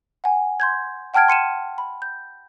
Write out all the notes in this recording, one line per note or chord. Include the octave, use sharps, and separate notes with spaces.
F#5 G#5
C6 G6 G#6
F#5 G5 A5 F6 G#6 D7
C6 C#7 D#7 E7
B5
G6